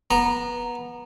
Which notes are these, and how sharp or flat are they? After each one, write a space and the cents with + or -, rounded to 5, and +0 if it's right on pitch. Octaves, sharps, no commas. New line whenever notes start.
B3 -20 A#5 +0